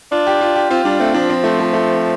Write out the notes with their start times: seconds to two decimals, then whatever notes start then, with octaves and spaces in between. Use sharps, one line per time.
0.12 D4 F4
0.27 G4
0.41 F4
0.56 G4
0.70 C4 F4
0.85 G3 D4
1.00 A3 C4
1.14 F3 D4
1.30 C4
1.44 A3
1.59 A3
1.73 A3